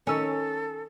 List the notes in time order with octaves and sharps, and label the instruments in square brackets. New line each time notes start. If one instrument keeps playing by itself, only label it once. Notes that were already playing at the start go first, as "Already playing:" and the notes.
[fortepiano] D#3 E6 [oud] C#4 [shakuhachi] A4